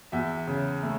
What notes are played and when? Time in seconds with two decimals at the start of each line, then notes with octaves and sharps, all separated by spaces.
0.12 E2 E5
0.47 C#3
0.83 A3